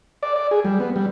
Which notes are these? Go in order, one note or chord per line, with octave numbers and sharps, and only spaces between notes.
D5
D5
G#4
G3
B3
G3